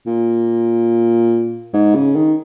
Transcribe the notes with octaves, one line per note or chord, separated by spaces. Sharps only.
A#2
G#2
C#3
D#3